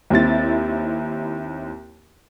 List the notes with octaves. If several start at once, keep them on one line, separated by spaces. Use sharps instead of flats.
D#2 C4 E4 A6